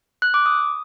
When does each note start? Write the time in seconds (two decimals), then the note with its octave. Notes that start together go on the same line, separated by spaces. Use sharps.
0.22 F#6
0.34 D6
0.46 D#6